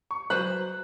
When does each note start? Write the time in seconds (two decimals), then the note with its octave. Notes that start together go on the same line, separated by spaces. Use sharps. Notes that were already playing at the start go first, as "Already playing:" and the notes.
0.11 C#6
0.30 F#3 B4 C5 B5 F#6